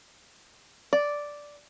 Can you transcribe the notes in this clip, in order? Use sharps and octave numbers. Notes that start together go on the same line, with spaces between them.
D5